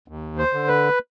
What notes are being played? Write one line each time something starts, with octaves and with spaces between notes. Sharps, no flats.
D#2
C5
D3
B4